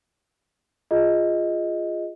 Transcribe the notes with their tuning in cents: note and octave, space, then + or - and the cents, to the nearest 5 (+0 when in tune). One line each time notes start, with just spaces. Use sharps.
F4 +0 G#4 -5 D#5 +5